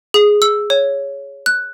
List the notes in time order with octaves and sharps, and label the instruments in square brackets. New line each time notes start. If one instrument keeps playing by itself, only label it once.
[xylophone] G#4
E6
C#5
F#6